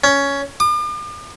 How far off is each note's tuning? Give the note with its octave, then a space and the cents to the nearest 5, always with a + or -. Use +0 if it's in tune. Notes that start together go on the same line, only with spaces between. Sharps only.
C#4 +10
D6 +45